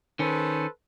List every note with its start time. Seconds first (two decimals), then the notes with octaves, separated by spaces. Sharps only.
0.19 D#3 C#4 A4 B4 C5